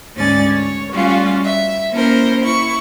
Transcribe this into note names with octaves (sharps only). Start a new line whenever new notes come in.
D2 G#2 C#4 D5 G#5 A6
C#5
G3 A3 C#4 F4 F#4
E5
A#3 C#4 E4 A#4 C5
E4 C#6